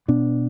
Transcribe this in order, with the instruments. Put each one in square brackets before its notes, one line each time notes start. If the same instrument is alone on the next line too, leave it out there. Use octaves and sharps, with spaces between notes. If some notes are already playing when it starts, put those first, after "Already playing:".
[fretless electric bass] B2 B3 D4